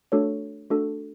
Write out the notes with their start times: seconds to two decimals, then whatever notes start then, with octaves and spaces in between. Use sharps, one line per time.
0.12 A3 D4 F#4 A4 C#5
0.70 A3 D4 F#4 A4